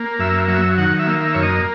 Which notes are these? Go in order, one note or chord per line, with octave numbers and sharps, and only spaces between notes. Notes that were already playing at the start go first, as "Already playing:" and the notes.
Already playing: A#3
F#2 E5
F#3 E5
D#3 F#5
E5
A#3
E5
F#2 C#5
D#5